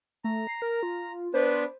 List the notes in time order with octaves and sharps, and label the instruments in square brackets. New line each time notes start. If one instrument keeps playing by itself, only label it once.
[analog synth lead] A3 [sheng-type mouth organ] A#5
[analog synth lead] C7
A#4
F4
[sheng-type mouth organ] B3 D4 B4 [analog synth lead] C5